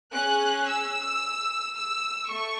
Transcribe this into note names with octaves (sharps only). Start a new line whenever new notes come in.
C#4 G#4 F#6
E6
E6
A3 C#6